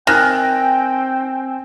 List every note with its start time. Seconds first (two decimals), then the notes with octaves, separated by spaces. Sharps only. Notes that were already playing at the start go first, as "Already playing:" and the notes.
0.07 D#3 C4 G5 G#5 F#6 A#6